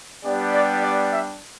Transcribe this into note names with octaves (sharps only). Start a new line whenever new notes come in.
G3 B3 D4 G4 D5
D5
D5
E5